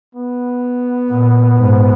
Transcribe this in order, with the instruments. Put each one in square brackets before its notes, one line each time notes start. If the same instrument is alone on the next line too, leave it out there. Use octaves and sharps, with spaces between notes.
[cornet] B3
[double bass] A#2
G#2